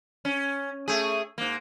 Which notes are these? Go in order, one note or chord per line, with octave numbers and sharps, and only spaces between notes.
C#4
A3 G#4
G#2 A#3